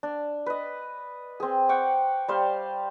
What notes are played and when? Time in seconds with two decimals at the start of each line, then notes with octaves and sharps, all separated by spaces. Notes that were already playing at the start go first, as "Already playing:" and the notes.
0.03 D4
0.46 B4 D#5
1.40 C4 G#4
1.69 F#5 G5 C#6 D6
2.28 G3 C5 F5